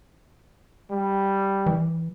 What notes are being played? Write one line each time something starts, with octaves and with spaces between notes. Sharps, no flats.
G3
E3